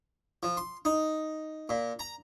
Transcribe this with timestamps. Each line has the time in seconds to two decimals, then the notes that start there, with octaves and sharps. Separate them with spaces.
0.43 F3
0.57 C6
0.85 D#4
1.69 A#2
1.99 A#5